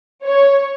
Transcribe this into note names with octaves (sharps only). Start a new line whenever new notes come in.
C#5